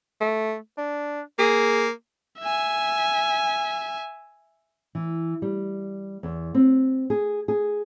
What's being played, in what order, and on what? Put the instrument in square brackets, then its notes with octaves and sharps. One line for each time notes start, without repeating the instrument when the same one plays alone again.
[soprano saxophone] A3
D4
[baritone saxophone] A#3 [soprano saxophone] G#4
[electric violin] E5 G#5
[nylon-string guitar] E3
G3
E2
C4
G#4
G#4